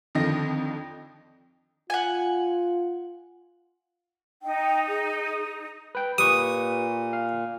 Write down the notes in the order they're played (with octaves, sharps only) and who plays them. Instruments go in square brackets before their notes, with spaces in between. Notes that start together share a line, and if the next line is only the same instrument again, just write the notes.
[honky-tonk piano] F2 D3 D#3 F3 D#5 A#6
[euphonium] F4 [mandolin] F#5 G#5
[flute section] D#4 [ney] G5
[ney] G#4
[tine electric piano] B4 G5
[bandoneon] A#2 [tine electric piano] G4 B4 C#6 [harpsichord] D#6
[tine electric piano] F5